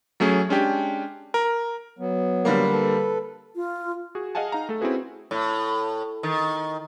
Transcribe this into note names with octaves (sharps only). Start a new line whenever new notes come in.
F#3 A3 C#4 G#4
G#3 C#4 D4 G4
A#4
F#3 B3
D3 G3 A#3
A4 B4
F4
F#4 G#4
G#4 D#5 F5 F#5 G#5 A5
D#4 F5 A#5
A3 A4
C4 C#4 E4 F#4 G#4 B4
A2
D#3